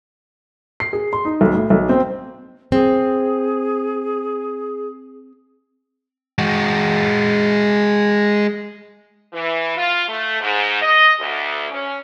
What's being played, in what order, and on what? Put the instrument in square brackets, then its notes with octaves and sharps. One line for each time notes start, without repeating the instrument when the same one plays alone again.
[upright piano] C7
G#4
C6
D#4
B1
A2
B1
C4
[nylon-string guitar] C4 [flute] G#4
[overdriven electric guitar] G#3 F#4
[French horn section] E3
F4
A3
G#2
D#5
D2
C#4